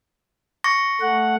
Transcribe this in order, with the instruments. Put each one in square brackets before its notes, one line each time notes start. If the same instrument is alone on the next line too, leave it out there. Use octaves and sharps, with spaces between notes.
[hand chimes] C#6 A#6
[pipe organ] A3 F#5